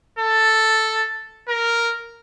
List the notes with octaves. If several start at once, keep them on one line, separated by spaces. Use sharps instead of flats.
A4
A#4